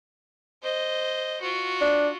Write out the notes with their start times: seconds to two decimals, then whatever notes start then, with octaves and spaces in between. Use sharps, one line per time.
0.62 C5 D#5
1.41 F4 F#4
1.81 D4